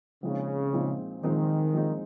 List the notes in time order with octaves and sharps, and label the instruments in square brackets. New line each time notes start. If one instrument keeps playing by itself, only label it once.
[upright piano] A#1 A#2 G#3 C4 D#4 [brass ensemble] C#3
[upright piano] A#1 A#2 G#3 C4 D#4
[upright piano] A#1 A#2 G#3 C4 D#4 [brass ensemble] D#3
[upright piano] A#1 A#2 G#3 C4 D#4